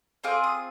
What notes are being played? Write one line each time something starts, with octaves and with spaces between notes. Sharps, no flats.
C4 F4 G#4 D6
D#6